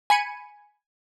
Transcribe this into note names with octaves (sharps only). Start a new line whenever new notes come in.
G#5 B5 C#7 D#7